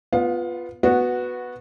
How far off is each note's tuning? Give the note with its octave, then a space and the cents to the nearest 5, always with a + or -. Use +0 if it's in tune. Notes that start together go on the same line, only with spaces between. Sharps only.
B3 +0 F4 +0 F5 +30
B3 +0 F#4 -10